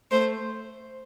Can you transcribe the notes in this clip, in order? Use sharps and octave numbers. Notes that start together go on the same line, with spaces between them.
A3 C5